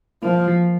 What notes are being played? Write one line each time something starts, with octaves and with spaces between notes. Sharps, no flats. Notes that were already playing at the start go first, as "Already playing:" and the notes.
F3 A#3
F3